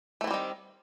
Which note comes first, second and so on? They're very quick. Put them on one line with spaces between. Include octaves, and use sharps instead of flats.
A3 E3 C4 G3 D#3